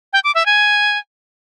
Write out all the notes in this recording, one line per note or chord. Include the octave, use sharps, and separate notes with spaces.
G5
D6
E5
G#5